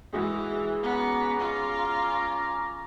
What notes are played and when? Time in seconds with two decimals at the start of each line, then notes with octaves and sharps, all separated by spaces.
0.13 E3 G#3 F#4 G#4
0.83 B3 C#4 A#5 D6
1.40 F4